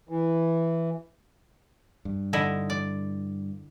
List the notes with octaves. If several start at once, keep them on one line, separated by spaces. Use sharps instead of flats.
E3
G2
D3 D#4 E4
D5